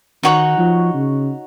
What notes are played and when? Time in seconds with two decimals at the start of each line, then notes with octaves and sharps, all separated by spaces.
0.23 D#3 D#4 F#4 C#5 F#5
0.58 F3
0.94 C#3